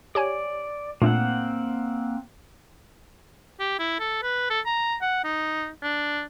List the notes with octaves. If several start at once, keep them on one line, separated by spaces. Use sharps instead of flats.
G4 C#5 D5 G#5
A#2 A3 A#3 C4 D4 F#5
G4
E4
A4
B4
A4
A#5
F#5
D#4
D4